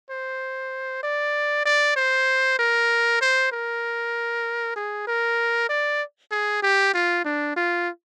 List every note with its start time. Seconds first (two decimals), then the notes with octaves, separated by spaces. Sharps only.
0.10 C5
1.03 D5
1.65 D5
1.96 C5
2.59 A#4
3.21 C5
3.52 A#4
4.76 G#4
5.07 A#4
5.69 D5
6.31 G#4
6.63 G4
6.94 F4
7.25 D4
7.57 F4